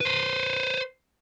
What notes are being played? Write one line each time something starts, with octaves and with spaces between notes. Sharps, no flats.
B4 C5